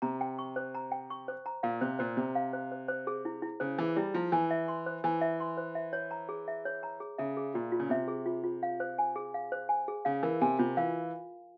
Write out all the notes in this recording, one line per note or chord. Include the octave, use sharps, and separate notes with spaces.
C3 A#5
G5
C#6
C5
A#5
G5
C#6
C5
A#5
A#2 F5
C3 C5
A#2 C5
C3 A#5
F5
C5
C5
C5
G#4
E4
E4
C#3 C5
E3 G#4
G3 E4
F3 E4
E3 G#5
E5
C6
C5
E3 G#5
E5
C6
C5
E5
C#5
A#5
G#4
E5
C#5
A#5
G#4
C#3 E5
G#4
A#2 F4
F4
C#3
C3 E5
G#4
F4
F4
F5
C5
G#5
G#4
F5
C5
G#5
G#4
C#3 F5
E3 A#4
C3 G#5
C3 F4
E3 F5